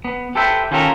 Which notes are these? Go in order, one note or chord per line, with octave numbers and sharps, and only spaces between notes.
B3
G4 A4 B4 C5 E5 G5
D#3 C#4 F4 G4 A4 A#4